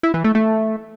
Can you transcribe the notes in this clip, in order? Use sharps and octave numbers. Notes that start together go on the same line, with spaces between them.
E4
E3
A3
A3